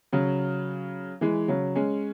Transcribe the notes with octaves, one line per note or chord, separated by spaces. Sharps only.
C#3 F#3
E3 G#3
C#3 F#3
G#3 C#4